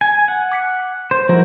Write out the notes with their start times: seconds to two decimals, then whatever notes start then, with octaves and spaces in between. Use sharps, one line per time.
0.01 G#5 G6
0.28 F#5
0.52 D6 B6 C#7
1.11 C5
1.29 F3 E4 F#4 A#4